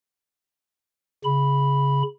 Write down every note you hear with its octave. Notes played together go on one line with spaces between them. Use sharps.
C#3 B5